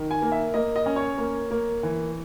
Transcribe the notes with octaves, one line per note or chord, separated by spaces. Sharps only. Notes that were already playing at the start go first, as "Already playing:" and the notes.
Already playing: D#3
G#5
A#3
E5
A#3 D#5
D#5
C#4
C#5
A#3
A#3
E3